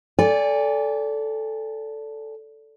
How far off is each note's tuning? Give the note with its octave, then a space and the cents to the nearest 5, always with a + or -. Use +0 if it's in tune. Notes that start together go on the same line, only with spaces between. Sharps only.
A4 +0 D5 -25 G#5 -30